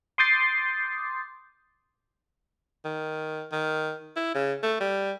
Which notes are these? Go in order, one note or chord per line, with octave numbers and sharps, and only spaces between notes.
C6 D6 D#6 G6 A6 C7
D#3
D#3
E4
C#3
A3
G3